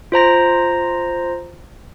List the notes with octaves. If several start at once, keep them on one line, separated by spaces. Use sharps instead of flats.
F4 C5 A#5 A#6